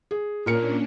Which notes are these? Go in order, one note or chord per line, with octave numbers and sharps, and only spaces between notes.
G#4
A#2 A#3 C#4 D4 A#4 C#7